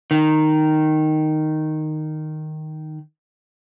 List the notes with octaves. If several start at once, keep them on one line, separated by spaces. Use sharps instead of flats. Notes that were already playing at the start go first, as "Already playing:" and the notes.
D#3